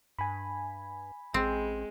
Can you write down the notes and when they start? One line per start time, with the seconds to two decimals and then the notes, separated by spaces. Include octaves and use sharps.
0.19 G2 G#5 B5
1.34 A1 G#3 C4